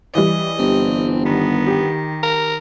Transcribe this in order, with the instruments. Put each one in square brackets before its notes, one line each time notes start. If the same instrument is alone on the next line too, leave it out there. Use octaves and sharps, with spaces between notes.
[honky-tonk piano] E3 G3 [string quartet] D#5
[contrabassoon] G1 [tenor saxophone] C4
[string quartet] D#3 [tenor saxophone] B3
[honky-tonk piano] G4
[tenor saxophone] A#4